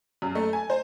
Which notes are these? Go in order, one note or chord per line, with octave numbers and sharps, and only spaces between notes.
F#2
A3
G#5
C5